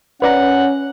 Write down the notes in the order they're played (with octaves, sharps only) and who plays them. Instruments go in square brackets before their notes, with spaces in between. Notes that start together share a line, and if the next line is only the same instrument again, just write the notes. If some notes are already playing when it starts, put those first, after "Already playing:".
[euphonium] C#4 [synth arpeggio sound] B4 D5 A#5 [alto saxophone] F#5